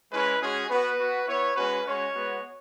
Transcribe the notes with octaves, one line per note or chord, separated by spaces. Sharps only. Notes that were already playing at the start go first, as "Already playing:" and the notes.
G#3 C#4 E4 B4
G#3 C#4 F#4 G#4
B3 F#4 B4
B3 F#4
B3 E4 C#5
G#3 C#4 F#4 B4
G#3 C#4 F#4 C#5
G#3 B3 F#4